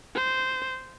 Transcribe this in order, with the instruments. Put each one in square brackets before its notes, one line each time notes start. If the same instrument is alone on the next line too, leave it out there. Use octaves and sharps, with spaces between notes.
[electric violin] C5